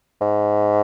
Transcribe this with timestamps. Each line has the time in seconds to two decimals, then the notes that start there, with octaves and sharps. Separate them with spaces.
0.21 G#2